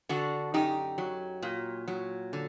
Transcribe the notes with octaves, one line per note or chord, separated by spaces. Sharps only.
D3 D4 F#4
F#2 D#4 G4
F#3
A#2
F#3
D3